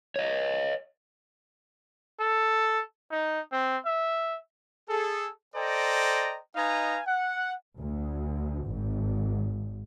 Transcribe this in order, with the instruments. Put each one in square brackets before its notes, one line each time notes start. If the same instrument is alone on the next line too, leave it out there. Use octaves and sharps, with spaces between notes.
[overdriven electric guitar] C#5 D#5
[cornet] A4
D#4
C4
E5
[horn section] G#4 A4
A4 C5 D5 D#5 G5 A#5
D#4 B4 D#5 F5 G#5 A#5
F#5
[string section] D2
G#1